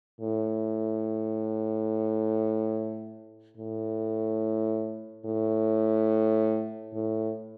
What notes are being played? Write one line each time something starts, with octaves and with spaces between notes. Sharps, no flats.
A2
A2
A2
A2